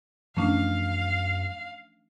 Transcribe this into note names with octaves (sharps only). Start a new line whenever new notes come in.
F#2 E3 F3 A3 C#4 D4 F5